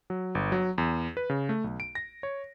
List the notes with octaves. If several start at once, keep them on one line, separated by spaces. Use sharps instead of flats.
F#3
G1
F#3
E2
B4
C#3
A3
B1
D7
A#6
C#5